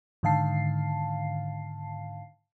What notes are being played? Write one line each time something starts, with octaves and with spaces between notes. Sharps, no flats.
G#2 D3 D#3 F5 A5 C7